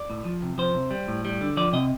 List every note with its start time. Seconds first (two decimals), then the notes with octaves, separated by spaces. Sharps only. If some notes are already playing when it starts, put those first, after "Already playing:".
Already playing: D5
0.10 A2
0.25 F3
0.42 C3
0.58 F3 C5
0.74 C3
0.91 G3
1.08 A2
1.25 G3
1.41 D3
1.57 F3 D5
1.73 C3 D#5